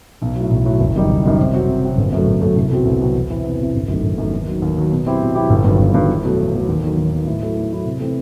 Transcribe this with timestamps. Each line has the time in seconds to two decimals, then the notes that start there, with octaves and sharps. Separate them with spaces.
0.22 B1
0.36 A2 F#3
0.51 B1
0.65 A2 F#3
0.80 F#1
0.95 F#2 D#3 G3 D#4
1.09 F#1
1.25 F#2 D#3 G3 D#4
1.39 C3
1.53 F#3 C4 F#4
1.68 C3
1.83 F#3 C4 F#4
1.97 G1
2.12 F#2 F#3 A3
2.27 G1
2.41 F#2 F#3 A3
2.56 C2
2.70 B2 F#3 C4 F#4
2.85 C2
3.00 B2 F#3 C4 F#4
3.14 E2
3.30 C3 E3
3.44 E2
3.59 C3 E3
3.74 G1
3.88 F#2 D#3 A3
4.03 G1
4.18 F#2 D#3 A3
4.33 D#2
4.47 D#3 F#3
4.62 D#2
4.77 D#3 F#3
4.92 B2
5.05 F#3 C4 E4 G4
5.21 B2
5.35 F#3 C4 E4 G4
5.50 G1
5.64 G2 D#3 F#3
5.79 G1
5.94 G2 D#3 F#3
6.09 E2
6.23 B2 F#3 A3
6.38 E2
6.53 B2 F#3 A3
6.68 D#2
6.83 D#3 F#3
6.98 D#2
7.12 D#3 F#3
7.26 A2
7.42 F#3 A3 E4
7.56 A2
7.71 F#3 A3 E4
7.85 C3
8.00 E3 A3 C4